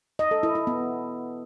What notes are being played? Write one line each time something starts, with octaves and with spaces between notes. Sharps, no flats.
D#5
A4
E4
E4
B3